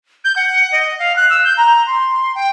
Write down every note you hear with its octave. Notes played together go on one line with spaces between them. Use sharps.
G6
F#5
D#5
F5
F#6
E6
G6
A#5
C6
G5